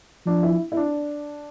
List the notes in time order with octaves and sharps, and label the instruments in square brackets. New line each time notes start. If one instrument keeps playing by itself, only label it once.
[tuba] F3 [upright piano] D4
[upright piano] E4
E4
D4